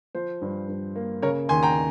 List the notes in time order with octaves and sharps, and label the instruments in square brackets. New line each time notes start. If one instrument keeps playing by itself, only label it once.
[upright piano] F3 C5
G2
G2
A#3
C#3 A#4 C#5
D#2 G#5 C6
G5 A#5